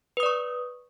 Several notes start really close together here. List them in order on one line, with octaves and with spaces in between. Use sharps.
B4 D#6 D5 C#6